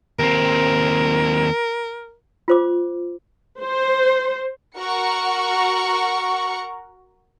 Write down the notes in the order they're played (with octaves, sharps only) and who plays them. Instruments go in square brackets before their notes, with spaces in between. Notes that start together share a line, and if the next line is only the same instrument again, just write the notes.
[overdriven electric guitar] D#2 C4 [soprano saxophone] A#4
[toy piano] F4 C5 D6
[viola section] C5
[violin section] F#4 A#4 F#5 A#5 C#6 C#7